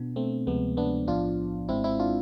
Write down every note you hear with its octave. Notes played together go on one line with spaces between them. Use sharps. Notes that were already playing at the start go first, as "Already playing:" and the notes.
Already playing: B2 B3 D4
A3 C4
D2 C3 F3 G#3 B3
B3 D4
B1 A2 F3 B3 D4 F4
G#1 G#2 G#3 C4 E4
C4 E4
D4 F4